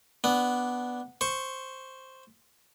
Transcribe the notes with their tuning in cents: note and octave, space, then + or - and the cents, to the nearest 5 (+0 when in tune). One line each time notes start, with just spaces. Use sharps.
B3 +0 D4 +0
C5 +0 C#6 +0